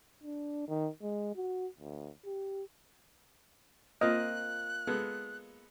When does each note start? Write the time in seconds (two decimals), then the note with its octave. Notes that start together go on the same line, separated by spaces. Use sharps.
0.23 D4
0.68 D#3
1.02 G#3
1.36 F#4
1.79 D2
2.25 G4
4.01 A#3 C4 F4 D#5 F6 F#6
4.87 G#3 B3 A4